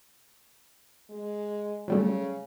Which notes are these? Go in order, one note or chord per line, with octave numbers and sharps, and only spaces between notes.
G#3
C#3 F#3 G3 A3